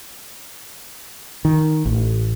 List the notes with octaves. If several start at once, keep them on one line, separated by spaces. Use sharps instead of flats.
D#3
A1